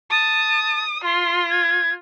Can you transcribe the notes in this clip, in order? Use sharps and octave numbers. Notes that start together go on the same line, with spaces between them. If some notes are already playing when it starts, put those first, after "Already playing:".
A5 D#6
F4 C6
G#6